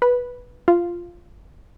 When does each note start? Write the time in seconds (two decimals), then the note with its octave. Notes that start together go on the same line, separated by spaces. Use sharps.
0.02 B4
0.68 F4